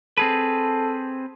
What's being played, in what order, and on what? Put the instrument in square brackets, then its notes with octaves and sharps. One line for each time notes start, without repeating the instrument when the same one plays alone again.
[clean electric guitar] C4 G#4 B4 [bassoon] A4